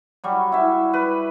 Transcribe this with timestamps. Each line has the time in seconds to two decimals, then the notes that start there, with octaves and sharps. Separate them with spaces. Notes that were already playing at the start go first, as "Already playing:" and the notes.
0.24 F#3 G3 F#4
0.52 E4 E5
0.94 B4